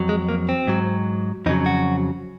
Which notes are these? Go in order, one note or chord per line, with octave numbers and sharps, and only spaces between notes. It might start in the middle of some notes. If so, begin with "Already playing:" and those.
Already playing: F2 F#3
G#3
A#3
C4
G#2 F#3
F2 C#3 F#3 D#4
F#4